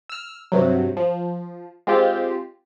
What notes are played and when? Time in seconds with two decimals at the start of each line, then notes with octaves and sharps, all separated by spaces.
0.09 E6 F6
0.52 G2 C3 F#3
0.97 F3
1.87 G#3 C4 F4 G4